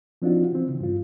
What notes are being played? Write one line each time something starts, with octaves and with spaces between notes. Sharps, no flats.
F3 C4 D4 D#4 F4 F#4
E3 C4
C#3
G2 F4